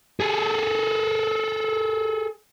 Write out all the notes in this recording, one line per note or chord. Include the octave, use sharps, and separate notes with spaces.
G#4 A4